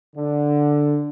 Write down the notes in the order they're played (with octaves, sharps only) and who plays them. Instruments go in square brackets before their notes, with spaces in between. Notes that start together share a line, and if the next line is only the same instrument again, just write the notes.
[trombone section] D3